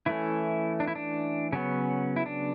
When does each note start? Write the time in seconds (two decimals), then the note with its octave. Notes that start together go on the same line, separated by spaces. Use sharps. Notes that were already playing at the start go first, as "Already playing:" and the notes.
0.06 E3 A3 C#4 E4
0.80 D4
0.87 E4
0.95 D4
1.52 C#3 F#3 B3 C#4
2.16 E4
2.26 D4